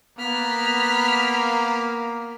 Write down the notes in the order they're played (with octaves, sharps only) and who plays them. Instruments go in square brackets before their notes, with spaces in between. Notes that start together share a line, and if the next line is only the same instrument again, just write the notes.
[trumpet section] A#3 [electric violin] B3 [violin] F6 B6